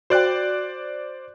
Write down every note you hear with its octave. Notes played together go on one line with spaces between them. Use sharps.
F#4 C5 D5 F5 G5 F#6